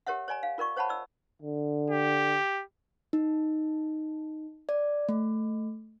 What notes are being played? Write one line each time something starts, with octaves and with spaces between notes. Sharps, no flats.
G4 A#4 C#5 E5 F#5
C#5 D5 G#5 A#5
F5
F4 A#4 D5 C#6
C5 C#5 F#5 A5 B5
D5 E6
D3
G4
D#4
D5
A3